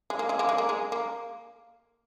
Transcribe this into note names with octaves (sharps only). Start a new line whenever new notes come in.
G#3
A#3
G#3
A#3
G#3
A#3
G#3
A#3